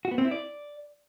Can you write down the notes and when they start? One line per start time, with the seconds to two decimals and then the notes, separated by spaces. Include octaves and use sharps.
0.05 F#4
0.11 B3
0.18 C4
0.25 E4
0.31 D5